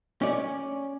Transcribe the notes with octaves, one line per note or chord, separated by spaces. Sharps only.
C#4 D5